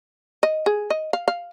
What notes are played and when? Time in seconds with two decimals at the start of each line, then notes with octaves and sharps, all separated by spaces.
0.43 D#5
0.66 G#4
0.90 D#5
1.13 F5
1.28 F5